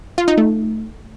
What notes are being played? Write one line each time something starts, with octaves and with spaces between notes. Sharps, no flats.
F4
D#4
A3